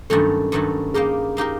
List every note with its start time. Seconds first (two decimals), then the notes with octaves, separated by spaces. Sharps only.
0.10 G2 D#3 F#3 A3 C#4 A4
0.52 G2 D#3 F#3 A3 C#4
0.94 A#3 D#4 G4 G#4 A#4
1.37 A#3 D#4 G4 A#4